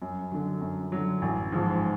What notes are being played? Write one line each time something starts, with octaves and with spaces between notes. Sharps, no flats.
F#2
D3 F#3
F#2
D3 F#3
A1
G#2 F3